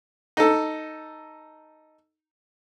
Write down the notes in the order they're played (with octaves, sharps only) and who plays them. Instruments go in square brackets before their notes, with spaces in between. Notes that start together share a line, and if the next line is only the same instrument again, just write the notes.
[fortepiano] D#4 A4